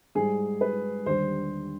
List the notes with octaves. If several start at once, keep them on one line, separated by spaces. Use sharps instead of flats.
G#2 G3 G#4
B4
D#2 D3 G3 C5